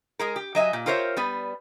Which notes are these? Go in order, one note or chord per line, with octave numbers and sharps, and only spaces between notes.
G#3 G#4 A#4
G4
F#3 D#5 E5 G#5
A#2
F4 G4 A#4 C5 C#5 E5
G3 B3 B4